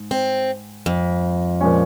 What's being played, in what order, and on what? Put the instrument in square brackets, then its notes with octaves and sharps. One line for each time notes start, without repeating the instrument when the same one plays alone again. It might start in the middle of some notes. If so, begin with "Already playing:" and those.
Already playing: [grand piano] G#2
[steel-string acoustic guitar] C4
F2
[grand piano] A#2 F3 G#3 C#4